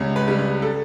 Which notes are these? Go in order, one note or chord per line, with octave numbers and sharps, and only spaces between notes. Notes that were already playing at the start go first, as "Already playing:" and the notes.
Already playing: C#2 C#3 G3 C#5
B4
C#3 G3
B4
A4